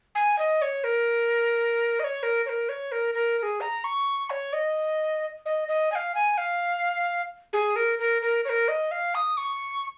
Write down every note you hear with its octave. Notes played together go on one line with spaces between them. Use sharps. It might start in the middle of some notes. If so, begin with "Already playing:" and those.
G#5
D#5
C#5
A#4
D#5
C#5
A#4
C#5
A#4
C#5
A#4
A#4
A#4
G#4
A#5
C#6
C#5
D#5
D#5
D#5
G#5
F5
G#5
F5
G#4
A#4
A#4
A#4
C#5
A#4
D#5
F5
D#6
C#6